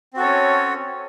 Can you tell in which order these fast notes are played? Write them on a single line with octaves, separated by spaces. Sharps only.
C4 F#4 A4 C#5 C#4